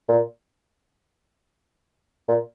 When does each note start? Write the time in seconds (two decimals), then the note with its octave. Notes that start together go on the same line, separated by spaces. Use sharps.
0.09 A#2
2.28 A#2